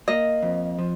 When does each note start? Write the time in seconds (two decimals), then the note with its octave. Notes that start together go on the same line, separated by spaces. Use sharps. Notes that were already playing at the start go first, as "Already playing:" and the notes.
0.08 A#3 D#5
0.42 F2
0.79 F3